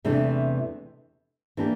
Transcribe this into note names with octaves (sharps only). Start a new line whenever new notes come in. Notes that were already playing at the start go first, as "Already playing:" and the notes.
E2 C3 E3 A3 D4
E3 A#3 D4 G4